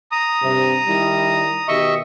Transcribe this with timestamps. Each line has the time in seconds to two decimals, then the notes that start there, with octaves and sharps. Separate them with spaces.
0.12 A#5 D#6
0.43 G2 C3
0.87 D#3 G3 E4
1.68 B2 D#3 G4 D#5 E5 C#6